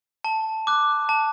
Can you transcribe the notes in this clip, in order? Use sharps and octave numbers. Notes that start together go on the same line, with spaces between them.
A5
D6 F#6
A5